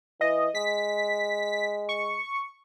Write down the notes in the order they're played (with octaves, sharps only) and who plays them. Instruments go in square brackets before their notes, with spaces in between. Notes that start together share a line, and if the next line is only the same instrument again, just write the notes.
[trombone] E3 [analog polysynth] D#5
[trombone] G#3 [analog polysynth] B6
[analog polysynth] C#6